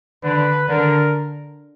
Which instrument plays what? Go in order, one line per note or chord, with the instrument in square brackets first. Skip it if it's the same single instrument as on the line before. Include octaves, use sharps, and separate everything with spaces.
[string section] D3 [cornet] B4
[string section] D3 [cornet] A#4